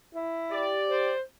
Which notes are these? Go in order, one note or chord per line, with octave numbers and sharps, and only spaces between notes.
E4
G4 D5
C5